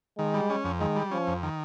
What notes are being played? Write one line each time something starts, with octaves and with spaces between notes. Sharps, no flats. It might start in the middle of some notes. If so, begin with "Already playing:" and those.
D#3 G#3
G3
C#4
F2
D#3 G#3
G3
F3 C#4
F2
D#3